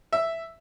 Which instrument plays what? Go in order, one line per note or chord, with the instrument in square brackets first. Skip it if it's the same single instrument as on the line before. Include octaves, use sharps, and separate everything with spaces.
[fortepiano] E5